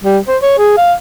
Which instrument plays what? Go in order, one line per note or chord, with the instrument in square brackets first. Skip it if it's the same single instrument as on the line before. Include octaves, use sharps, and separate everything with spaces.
[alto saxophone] G3
C5
C#5
G#4
F5